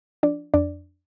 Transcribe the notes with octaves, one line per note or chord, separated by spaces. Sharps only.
F3 D4 D5
F2 D4 D5